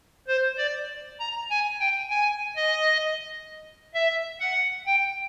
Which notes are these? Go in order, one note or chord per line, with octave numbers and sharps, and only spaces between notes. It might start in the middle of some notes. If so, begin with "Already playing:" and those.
C5
D5
A#5
G#5
G5
G#5
D#5
E5
F#5
G5